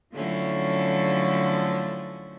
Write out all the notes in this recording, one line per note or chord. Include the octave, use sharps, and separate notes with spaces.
D3 F3 F#3 A3 C#4 E4